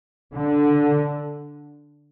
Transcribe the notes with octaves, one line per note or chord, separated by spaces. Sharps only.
D3